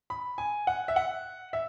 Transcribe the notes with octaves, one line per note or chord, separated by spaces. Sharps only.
B5
G#5
F#5
E5
F#5
E5